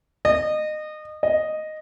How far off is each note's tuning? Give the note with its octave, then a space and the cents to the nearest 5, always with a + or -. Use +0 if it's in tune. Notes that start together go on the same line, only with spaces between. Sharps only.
D#5 -25
D#5 -5